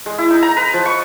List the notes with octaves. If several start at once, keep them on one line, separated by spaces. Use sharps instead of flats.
G#3
E4
D#4
A#5
B4
F3
C#6